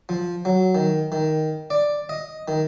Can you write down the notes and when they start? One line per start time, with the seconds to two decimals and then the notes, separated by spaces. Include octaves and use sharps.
0.09 F3
0.45 F#3
0.75 D#3
1.12 D#3
1.70 D5
2.09 D#5
2.48 D#3